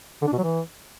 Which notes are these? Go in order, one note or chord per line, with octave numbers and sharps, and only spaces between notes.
D3
D4
B2
F#3
E3